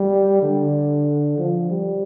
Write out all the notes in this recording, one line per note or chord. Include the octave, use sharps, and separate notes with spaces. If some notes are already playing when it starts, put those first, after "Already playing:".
Already playing: G3
D3
F3
G3